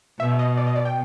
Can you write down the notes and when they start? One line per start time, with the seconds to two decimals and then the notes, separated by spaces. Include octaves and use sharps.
0.20 B2 E5
0.39 D#5
0.57 D5
0.67 D#5
0.76 D5
0.85 G5